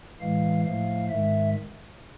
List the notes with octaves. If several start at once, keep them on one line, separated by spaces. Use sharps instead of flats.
A2 E3 G#3 F5
A2 F3 A3 F5
G#2 D#3 G#3 E5